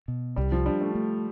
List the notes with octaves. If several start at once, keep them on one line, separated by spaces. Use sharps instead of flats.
B2
C2 G3
F3
G3 D4
A3
A3